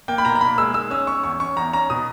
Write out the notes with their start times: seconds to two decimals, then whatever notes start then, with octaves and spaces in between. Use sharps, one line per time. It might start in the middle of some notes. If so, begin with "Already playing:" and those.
0.08 A#3 G5
0.18 B5
0.25 B2 A#5
0.35 A#5
0.41 A#3 B5
0.58 G#3 E6
0.74 G#3 E6
0.91 C#4 E6
1.07 C#4 C#6
1.24 E2 C#6
1.40 C#4 C#6
1.57 E2 A#5
1.73 C#4 A#5
1.90 B2 D#6